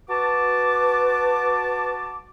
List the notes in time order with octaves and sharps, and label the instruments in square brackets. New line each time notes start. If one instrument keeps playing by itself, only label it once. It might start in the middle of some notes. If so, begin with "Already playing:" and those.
[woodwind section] F#4 A5 D6 [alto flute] B4